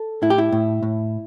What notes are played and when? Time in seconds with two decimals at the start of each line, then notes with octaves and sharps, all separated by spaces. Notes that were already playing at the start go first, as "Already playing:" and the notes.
Already playing: A4
0.22 A2 E4
0.30 G4
0.38 E4
0.52 A2
0.83 A2